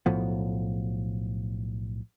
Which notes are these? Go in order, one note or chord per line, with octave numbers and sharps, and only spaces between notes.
B1 A2 F3 B3